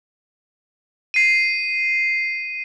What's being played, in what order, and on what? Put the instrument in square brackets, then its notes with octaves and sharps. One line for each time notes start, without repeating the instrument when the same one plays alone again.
[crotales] C7 D#7